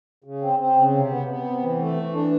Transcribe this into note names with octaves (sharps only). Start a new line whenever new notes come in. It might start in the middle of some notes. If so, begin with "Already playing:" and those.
C#3
C4
C4
C#3
C3
B3
B3
C3
E3
A3
E3
D4